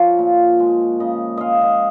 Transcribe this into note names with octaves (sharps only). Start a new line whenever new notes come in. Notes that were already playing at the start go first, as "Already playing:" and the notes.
Already playing: F3 C#5
A#2
G#3
C#3 D#5
G#3 D#5 F5
D#5